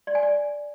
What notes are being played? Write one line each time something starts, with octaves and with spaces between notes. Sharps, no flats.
D5
G#5
D5